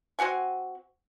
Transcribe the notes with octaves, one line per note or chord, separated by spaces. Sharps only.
C4 F#4 F#5 G#5